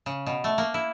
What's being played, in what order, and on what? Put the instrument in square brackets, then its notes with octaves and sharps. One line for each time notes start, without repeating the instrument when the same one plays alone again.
[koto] C#3
B2
A3
A#3
E4